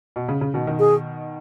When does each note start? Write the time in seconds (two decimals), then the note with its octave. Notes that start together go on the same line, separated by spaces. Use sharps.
0.16 B2
0.29 C#3
0.41 C#3
0.54 B2 D#3
0.67 B2 D#3
0.79 G#4